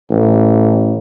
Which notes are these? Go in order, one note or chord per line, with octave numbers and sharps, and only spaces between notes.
A1